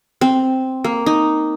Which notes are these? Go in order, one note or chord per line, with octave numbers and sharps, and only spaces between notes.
C4
A#3
D#4